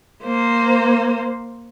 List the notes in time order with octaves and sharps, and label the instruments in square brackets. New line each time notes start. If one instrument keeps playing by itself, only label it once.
[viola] A#3 C5